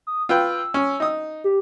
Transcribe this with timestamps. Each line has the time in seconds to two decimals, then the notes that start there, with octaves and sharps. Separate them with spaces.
0.07 D#6
0.29 F4 B4 G5 E6
0.74 C#4
1.00 D#4 D#6
1.44 G4